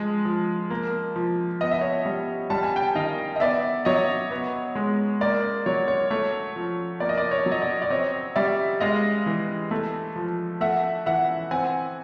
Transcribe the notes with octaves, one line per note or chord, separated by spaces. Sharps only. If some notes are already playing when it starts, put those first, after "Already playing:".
Already playing: F3 G#3 D#5
F3
A#3
F3
B3 D#5
E5
C#5 D#5
G3
G3 A5
G#5
G5 A5
D#3 D#5 F5
D#5
B3 D5 E5
F#3 C#5 D#5
B3
G#3
A#3 D5
F#3 C#5
C#5
A3 C#5
F3
A#3 D5
D#5
D5
C#5
F#3
D#5
D5
D5
C4 C#5 D#5
G3 D5 E5
G#3 D#5 F5
E3
A3
F3
A3 E5 F#5
E3 E5 F#5
C4 F#5 G#5